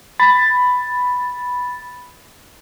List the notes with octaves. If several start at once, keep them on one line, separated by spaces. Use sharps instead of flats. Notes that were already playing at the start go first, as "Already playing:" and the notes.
B5 A6